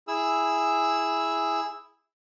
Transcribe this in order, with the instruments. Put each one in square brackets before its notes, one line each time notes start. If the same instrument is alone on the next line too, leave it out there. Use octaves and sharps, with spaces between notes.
[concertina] E4 G#4 E6